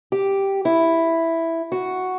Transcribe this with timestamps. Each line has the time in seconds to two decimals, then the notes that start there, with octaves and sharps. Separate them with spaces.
0.12 G4
0.65 E4
1.72 F#4